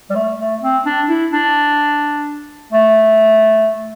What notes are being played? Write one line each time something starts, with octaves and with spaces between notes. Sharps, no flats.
G3
A3
A3
C4
D4
E4
D4
A3